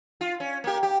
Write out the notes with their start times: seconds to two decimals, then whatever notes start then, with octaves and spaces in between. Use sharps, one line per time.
0.21 F4
0.40 C#4
0.64 A#3 G4
0.83 G4